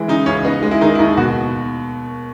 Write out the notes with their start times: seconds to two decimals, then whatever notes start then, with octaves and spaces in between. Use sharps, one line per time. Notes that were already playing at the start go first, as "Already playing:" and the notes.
Already playing: E3 G#3
0.08 C#3 D#4
0.26 C#2 C#4
0.45 B3 D#4
0.63 G#3
0.71 E4
0.81 D#3 D#4
0.95 E4
0.99 D#2 D#4
1.17 B2 F#4